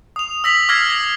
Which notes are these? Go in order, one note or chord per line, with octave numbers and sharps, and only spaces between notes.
D#6 F7
E6 A#6 B6 F#7
D6 E6 F6 G#6 A#6 C7
A#6